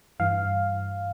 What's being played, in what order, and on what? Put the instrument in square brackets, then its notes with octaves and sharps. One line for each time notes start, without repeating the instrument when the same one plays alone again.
[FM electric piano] G2 E3 F5